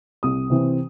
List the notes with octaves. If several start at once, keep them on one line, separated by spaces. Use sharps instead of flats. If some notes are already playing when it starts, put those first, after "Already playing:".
C2 D#6
C3 E3 C4